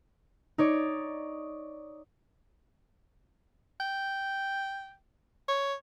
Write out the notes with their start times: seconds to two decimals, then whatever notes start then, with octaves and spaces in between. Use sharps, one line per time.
0.58 D#4 C#5 D5
3.80 G5
5.48 C#5